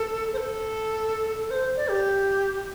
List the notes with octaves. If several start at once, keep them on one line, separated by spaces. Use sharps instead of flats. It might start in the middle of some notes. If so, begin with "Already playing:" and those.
Already playing: A4
C5
A4
C5
D5
G4